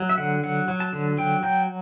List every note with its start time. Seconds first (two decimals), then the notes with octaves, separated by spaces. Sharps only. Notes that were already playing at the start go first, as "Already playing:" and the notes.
Already playing: F#3
0.09 E5
0.17 D3 F#5
0.43 F#3 F#5
0.68 F#3
0.80 A5
0.93 D3
1.17 F#3 G5
1.43 F#3 G5